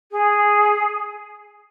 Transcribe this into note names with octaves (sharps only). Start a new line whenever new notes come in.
G#4